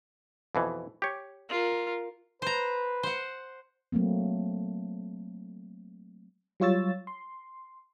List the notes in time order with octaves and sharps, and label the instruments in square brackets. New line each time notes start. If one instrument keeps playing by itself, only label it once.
[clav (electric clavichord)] F2 B2 E3
G4 C#5
[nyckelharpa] F4 A#4
[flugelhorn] B4 [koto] C5 A#5
[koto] C5 F#5
[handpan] F#3 A3 A#3 C4
[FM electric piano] F#3 G3 F4 C#5 E6 A6
C6